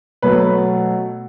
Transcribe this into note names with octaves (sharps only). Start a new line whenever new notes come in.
B2 F#3 A3 B4